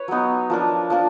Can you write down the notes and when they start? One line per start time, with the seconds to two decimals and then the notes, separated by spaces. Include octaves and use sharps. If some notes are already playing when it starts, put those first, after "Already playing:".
Already playing: B4 C#5
0.08 F#3 B3 D#4
0.50 F3 A#3 D4
0.90 F3 A#3 D4